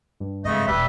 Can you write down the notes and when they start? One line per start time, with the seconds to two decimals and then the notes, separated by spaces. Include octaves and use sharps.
0.20 G2
0.45 F2 G#2 C#3 A3 D#5
0.67 E1 B2 G3 B4 E5